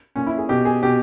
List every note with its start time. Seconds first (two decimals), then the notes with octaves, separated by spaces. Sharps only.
0.16 A#2 C#4
0.26 E4
0.38 G#4
0.49 B2 G4
0.65 G#4
0.83 B2 G4